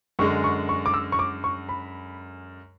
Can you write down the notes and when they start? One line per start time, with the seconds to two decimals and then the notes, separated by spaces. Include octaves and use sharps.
0.19 F#2 D3 G#3 C#6
0.44 C#6
0.69 C#6
0.86 D6
0.94 E6
1.12 C#6
1.19 D6
1.44 C#6
1.69 B5